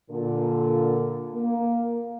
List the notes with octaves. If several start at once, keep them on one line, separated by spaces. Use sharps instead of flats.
A#2 D3
A#3